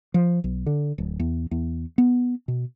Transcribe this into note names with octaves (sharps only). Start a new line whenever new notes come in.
F3
B1
D3
D1
E2
E2
B3
B2